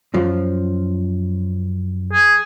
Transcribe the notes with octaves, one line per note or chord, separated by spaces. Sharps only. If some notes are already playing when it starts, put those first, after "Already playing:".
F#2 F3
G#4